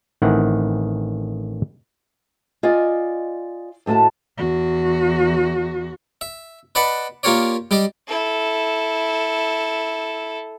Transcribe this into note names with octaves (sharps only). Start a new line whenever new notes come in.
A1 D#3 C4 E4 F#5
F4 D5 D#5 G#5
D#2 A2 A3 F#4 A5
E2 F#4
E5
B4 D5 D#5 F#5 A5 B5
A#3 F4 G4 A#4 C#5 D5
G3 G4 D5 D#5
E4 A4